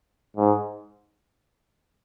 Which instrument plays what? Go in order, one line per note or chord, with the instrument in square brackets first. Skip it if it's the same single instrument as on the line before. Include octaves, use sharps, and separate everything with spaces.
[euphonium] G#2